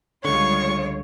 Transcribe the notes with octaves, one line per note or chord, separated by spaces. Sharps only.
C#2 D3 G3 G#3 F4 C#5 C#6